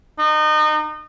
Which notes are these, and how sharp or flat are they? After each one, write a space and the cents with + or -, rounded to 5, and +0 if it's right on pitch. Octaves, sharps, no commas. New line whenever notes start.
D#4 -30